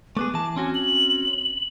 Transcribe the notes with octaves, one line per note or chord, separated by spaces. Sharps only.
A3 B3 G#4 D6
E3 A5
C4 C#4 F#4 G#5
F#7